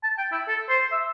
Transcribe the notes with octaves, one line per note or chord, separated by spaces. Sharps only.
A5
G5
E4
A4
C5
E5